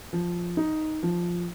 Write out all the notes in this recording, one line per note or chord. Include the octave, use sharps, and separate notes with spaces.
F3
D#4
F3